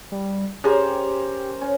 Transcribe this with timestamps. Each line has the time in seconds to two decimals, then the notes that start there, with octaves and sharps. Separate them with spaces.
0.12 G3
0.64 C#4 G4 G#4 A#4 C5
1.61 C#4